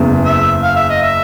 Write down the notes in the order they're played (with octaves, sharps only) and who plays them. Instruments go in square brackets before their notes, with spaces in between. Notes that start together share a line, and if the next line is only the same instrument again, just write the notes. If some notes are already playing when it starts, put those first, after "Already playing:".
Already playing: [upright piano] F#1 E2 C#3
[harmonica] E5
F5
E5
D#5
E5